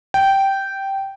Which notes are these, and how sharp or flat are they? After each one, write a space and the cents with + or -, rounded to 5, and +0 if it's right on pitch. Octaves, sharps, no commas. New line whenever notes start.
G5 -10